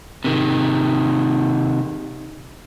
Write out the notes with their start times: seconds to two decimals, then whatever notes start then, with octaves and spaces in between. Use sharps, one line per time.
0.24 C3 D#3